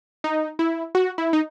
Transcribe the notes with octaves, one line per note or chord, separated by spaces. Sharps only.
D#4
E4
F#4
E4
D#4